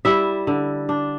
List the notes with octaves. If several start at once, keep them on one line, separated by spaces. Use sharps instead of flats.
G3 E4 E5
D3
D4